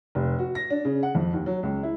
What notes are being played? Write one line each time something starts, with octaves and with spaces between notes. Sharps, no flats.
F1
F#4
A#6
D4
C#3
F#5
F2
D#2
F#3
C#2
E4